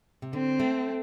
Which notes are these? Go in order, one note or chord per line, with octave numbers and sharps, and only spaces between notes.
C3
D3 C4
A3